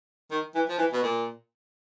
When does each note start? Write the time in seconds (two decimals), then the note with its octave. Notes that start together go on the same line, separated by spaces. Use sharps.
0.32 D#3
0.55 E3
0.69 F3
0.78 E3
0.93 B2
1.03 A#2